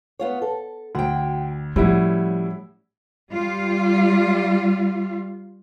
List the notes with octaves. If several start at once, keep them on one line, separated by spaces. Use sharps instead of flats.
B3 F4 C#5
A4
D2 F#4 G5
A2 F3 G3 C#4 E4 F#4
G3 F4